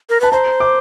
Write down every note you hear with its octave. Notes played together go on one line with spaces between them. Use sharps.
A#4
B4 A5
C5 A#5
D6